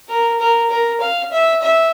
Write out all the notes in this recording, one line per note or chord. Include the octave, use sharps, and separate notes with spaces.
A#4
A#4
A#4
F5
E5
E5